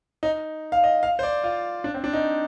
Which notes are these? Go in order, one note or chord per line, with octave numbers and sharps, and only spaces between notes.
D#4
F5
D#5
F5
C5
D5
F4
D4
C4
D4
D#4